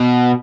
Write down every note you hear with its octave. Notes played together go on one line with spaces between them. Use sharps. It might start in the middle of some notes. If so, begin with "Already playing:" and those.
Already playing: B2